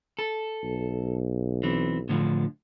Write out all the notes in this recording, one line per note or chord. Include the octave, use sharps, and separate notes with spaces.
A4
B1
E3 C4
A2 D3 F3